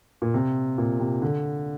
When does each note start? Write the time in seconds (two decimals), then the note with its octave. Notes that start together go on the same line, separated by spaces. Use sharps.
0.22 A#2
0.34 C3
0.78 A#2
0.99 C3
1.22 D3